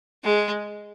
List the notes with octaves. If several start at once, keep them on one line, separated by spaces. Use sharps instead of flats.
G#3